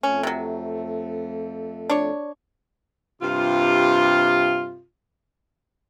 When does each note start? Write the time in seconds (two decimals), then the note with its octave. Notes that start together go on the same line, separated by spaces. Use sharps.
0.03 F2 A3 C#4
0.23 C3 F#3
1.90 D4 C#5
3.22 G2 C3 F4